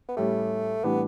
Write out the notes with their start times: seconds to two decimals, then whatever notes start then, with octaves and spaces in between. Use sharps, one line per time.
0.08 B3
0.16 A2 G3 A3 C#4 G4
0.84 A2 E3 G3 B3 D4 G4